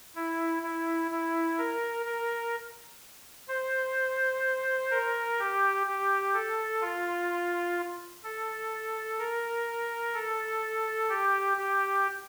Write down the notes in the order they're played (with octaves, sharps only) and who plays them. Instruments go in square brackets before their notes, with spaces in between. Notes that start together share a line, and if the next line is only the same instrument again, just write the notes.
[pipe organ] E4
E4
E4
A#4
A#4
C5
A#4
G4
G4
A4
F4
A4
A#4
A4
G4
G4